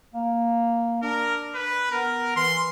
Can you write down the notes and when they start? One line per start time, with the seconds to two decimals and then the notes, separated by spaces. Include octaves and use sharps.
0.14 A#3
1.03 D4 A#4
1.54 B4
1.91 B3 A#4
2.36 E3 C6